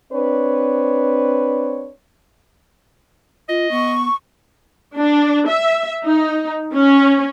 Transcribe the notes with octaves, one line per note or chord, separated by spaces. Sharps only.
C4 D4 B4 C#5
F4 D#5
B3 C#6
D4
E5
D#4
C#4